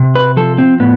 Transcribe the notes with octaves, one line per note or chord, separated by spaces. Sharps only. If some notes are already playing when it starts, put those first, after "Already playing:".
Already playing: C3
B4
F3 A4
C4
A2 B3